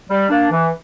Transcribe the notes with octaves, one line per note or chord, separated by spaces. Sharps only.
G3
A#3 D4
E3